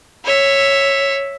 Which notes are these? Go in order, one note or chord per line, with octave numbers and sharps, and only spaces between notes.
C#5 E5